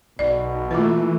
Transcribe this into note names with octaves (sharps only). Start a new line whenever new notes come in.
B1 B2 D5
E3 A3 A#3 F4 B4